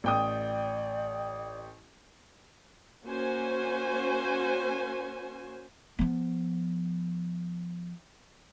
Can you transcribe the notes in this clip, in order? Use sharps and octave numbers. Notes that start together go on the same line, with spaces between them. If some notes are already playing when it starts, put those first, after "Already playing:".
A1 D5 G5 D#6
A#3 C#4 F#4 C5 G#5
F3 B3